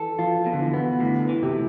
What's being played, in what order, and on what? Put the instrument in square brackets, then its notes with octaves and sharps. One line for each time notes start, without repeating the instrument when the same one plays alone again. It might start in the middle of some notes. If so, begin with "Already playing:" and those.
Already playing: [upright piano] E3 [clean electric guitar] A4
[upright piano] F3 [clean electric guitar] F4
[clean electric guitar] B2
[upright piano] D3
E3
[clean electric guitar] B3
[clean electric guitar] A2 [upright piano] D3
[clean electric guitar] E3
[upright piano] C3